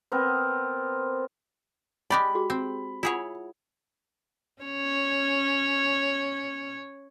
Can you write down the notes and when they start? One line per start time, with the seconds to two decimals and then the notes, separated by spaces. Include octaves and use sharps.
0.12 B3 C4 A#4
2.10 G#3 G4 D5 B5
2.35 F#4 G#4
2.50 C4
3.03 E4 F4 G#4 C#5 F#5
4.62 C#4 C#5